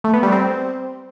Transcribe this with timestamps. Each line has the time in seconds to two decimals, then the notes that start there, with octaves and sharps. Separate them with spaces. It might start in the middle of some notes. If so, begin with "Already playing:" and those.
0.04 A3
0.14 B3
0.23 G3
0.32 C4